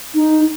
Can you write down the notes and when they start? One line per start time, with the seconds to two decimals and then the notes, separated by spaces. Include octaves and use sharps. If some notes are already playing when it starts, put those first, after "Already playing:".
0.15 D#4